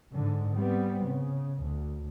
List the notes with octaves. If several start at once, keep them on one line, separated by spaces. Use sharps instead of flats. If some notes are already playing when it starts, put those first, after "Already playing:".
G#2 D3
G3 B3 C4
C#3
D2